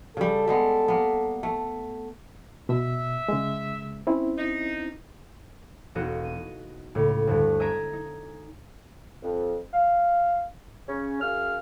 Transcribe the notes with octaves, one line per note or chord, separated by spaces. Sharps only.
C#3 G3 A4
G3 G#3 B3
A#3 B3
A3
B2 E5
C#3 G#3
C4 C#4 E4
D#4
E1 B3 D#4 F#4 D#5
D#7
C#2 A2
D2 G2
D#5 E5 G#5 A#5 D7
D#4
F2
F5
C#3 C#4
F#2 G#4 F5 F6